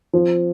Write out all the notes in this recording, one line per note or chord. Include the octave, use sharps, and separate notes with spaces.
F3 C4 F4 C5